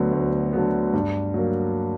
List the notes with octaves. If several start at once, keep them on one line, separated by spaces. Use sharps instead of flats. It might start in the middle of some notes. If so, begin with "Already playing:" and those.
Already playing: D2 D3 F#3 B3
D2
D3 F#3 B3
G2
F#3 A#3